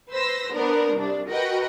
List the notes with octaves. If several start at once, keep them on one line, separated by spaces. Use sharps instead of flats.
B4 C5 C6 E6 A#6
B3 D4 A#4 C5
C2 D4
F#4 A#4 B4 D#5 F#5 G5